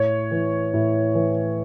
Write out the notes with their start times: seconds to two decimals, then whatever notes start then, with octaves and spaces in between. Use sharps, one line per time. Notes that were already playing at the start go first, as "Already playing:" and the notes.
Already playing: A2 C#5
0.31 E3
0.74 A2
1.15 E3